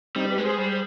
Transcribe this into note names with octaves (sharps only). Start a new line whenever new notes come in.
G3 C4 D#4
C5
G4 B4
G#3
G#4 C5
G3